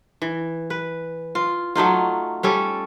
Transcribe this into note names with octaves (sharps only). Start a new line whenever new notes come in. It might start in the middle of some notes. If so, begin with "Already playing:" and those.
E3
B4
F4
F#3 A3 D#4 F4
G3 C#4 A4